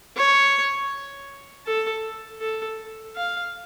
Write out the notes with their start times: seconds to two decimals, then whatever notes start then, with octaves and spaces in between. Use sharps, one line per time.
0.17 C#5
1.67 A4
2.41 A4
3.16 F5